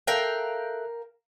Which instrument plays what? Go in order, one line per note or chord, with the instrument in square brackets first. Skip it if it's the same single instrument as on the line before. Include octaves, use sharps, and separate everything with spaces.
[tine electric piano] A4 E5 F#6 [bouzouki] A#4 F5 G5